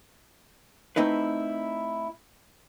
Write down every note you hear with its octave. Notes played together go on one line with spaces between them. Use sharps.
A3 C4 D#4 E4 B4